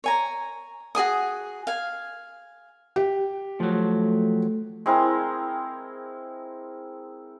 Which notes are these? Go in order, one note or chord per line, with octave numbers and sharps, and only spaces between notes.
C#5 G#5 A#5
F#4 G#4 G#5 D#6
F5 G#5
G4
F3 F#3 A3
G#3 C4 E4 A#4